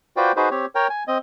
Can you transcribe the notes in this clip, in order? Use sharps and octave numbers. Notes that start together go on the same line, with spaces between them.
F4 F#4 B4 C5 D5 G5
D#4 F#4 G#4 B4 C5
C4 G4 C#5
A#4 C#5 G5
G#5
C4 D#5